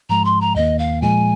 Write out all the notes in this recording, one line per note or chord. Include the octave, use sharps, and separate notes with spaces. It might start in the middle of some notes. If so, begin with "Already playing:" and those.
G#2 F3 G#3 A#5
C6
A#5
D#2 D#3 A#3 D#5
F5
A#2 F3 G#3 G#5